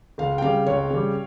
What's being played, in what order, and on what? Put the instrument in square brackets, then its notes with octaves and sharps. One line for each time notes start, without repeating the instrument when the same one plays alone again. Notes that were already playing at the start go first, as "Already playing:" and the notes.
[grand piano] C#2 [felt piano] F5
[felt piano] G5
[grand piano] C#3 G3 [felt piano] F5
[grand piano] C#2 [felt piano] C#5
[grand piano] C#3 G3